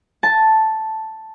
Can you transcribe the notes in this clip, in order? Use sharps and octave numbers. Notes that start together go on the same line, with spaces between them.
A5